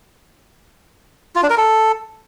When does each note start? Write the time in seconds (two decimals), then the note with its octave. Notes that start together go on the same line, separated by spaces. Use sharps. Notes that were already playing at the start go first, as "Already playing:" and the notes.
1.36 F4
1.43 D4
1.50 A#4
1.57 A4